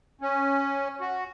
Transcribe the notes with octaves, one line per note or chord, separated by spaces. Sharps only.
C#4
F#4